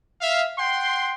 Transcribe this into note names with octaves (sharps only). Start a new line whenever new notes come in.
E5 F5
F#5 G5 C6